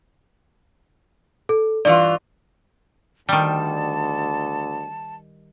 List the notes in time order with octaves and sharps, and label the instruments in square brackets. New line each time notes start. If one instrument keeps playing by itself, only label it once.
[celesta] A4
[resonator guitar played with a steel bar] G2 E3 F4 [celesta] D5
[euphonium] D2 [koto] D#3 G3 [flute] A5